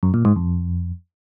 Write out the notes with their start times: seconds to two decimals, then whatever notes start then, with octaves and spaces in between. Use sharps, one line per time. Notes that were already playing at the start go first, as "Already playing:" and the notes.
0.03 F#2
0.14 A#2
0.25 G#2
0.36 F2